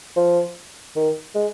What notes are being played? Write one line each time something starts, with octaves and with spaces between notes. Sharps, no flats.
F3
D#3
G#3